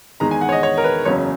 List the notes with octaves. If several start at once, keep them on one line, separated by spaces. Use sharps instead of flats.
E2 D#3 G#3 A#5
G#5
F#5
C#5
D#5
C#5
A#4
B4
F#1 E2 C#3 F#3 C#5